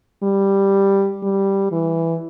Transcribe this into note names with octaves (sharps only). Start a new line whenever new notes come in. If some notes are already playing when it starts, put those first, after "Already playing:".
G3
G3
E3